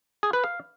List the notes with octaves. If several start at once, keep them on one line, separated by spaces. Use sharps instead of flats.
G#4
B4
F5